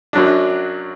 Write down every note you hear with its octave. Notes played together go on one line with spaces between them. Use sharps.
F#2 F#3 D4